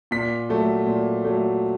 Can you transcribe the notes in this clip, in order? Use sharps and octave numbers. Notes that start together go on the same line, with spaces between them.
A#2 B6
F#3 A3
A#2
F#3 A3